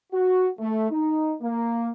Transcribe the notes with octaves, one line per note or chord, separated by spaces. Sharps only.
F#4
A3
D#4
A#3